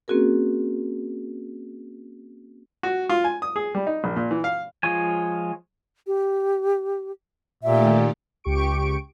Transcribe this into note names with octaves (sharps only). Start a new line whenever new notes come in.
A#3 C4 C#4 F#4 G#4 A#4
F#4
F4
G#5
D#6
G#4
G3
D#4
A#1
A#2
E3
F5
F3 G#3 F4 C#5 G#5
G4
A#2 D#3 A3 G4 E5
C#2 G4 C#6 D7